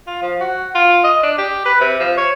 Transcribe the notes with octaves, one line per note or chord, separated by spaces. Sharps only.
F4
F3
F#4
F4
D#5
D4
G4
B4
C3
F3
C#5